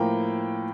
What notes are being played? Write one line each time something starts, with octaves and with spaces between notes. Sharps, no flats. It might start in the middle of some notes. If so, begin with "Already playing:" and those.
Already playing: A2 F3 A#3 G5